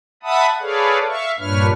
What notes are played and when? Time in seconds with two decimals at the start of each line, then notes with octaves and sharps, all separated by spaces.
0.23 E5 F#5 A5 B5 D#6
0.61 G#4 A4 B4 C#5 D5 F5
1.07 E5 F5 C#6
1.39 G2 A#2 D4 B4 C#5 F6